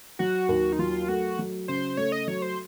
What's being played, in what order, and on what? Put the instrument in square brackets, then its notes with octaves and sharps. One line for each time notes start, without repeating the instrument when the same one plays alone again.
[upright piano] F#3 [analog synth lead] F#4
[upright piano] D#2
[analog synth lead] D#4
[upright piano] F#3 [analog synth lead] F4
[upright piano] A3 [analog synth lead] F#4
[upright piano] F#3
[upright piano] C#3 [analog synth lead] C5
[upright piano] A3 [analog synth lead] C#5
[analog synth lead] D#5
[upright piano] F#3 [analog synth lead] C#5
[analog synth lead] C5